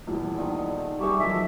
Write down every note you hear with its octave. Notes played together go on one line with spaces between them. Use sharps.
D#1 E2
D3 D#3 D#4
G3 G4 G#4 B4 E5 C#6 D6
D#3 F3 F#3 G#3 A4 E5